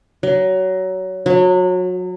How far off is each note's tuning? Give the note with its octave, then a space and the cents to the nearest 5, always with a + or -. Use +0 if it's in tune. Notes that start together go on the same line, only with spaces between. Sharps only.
F#3 +20
F#3 -25